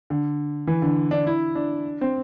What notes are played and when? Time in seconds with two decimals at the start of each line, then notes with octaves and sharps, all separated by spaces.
0.10 D3
0.67 E3
0.82 D3
1.11 D4
1.27 E4
1.55 D4
2.01 C4